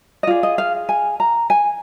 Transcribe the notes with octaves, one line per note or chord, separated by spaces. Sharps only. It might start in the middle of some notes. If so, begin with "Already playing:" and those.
D#5
F4 G#4 D5
D#5
F5
G#5
A#5
G#5